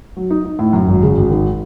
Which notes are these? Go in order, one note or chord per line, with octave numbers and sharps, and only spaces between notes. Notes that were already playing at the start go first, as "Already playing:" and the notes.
F#3
D#4
D#4
A2
F#2
G#1
C#3
G#1
D#3